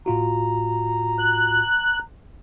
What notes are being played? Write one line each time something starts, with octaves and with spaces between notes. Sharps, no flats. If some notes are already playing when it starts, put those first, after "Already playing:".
A2 F4 F#4 A#5
F#6